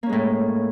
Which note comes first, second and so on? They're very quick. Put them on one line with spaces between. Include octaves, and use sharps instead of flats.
A#3 C#4 G#3 A2